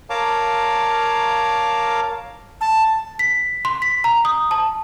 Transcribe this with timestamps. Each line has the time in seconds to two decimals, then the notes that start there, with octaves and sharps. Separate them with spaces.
0.10 A#4 C#5 F5 A5 A#5 D6
2.61 A5
3.19 B6
3.65 C6
3.82 B6
4.04 A#5
4.25 D#6
4.51 A5